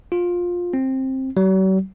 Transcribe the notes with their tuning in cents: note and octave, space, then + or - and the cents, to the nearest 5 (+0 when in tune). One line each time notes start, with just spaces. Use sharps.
F4 +15
C4 +15
F#3 +45